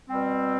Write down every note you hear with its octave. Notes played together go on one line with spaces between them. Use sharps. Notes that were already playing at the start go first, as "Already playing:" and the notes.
B2 G3 C4